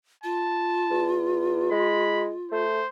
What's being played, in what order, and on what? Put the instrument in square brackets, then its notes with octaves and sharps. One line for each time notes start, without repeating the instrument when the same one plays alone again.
[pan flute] F4 [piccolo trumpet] A5
[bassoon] E2
[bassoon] G#3 [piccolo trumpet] B5
[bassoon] A3 [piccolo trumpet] C5